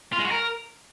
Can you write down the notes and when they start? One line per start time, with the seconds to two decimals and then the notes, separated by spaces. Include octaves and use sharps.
0.13 F4
0.19 G#3
0.25 F#4
0.31 A#4